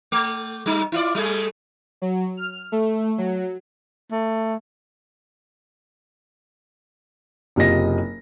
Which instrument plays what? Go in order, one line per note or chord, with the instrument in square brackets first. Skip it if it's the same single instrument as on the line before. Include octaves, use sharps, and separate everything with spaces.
[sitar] A3
G3 D#4
E4 F4 D5
G3 A3 G#4
[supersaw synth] F#3
F6
A3
F#3
[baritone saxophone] A3
[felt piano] F#1 C3 F4 D#5 A#6